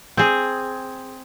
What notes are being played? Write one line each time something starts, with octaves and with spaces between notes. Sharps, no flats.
C4 G#4